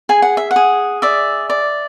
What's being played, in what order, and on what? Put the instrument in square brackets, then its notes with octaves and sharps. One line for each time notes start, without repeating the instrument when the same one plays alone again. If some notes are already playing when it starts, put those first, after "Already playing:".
[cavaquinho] G#4 G#5
F#5
E5
F#5
G#4
D5 E5
D5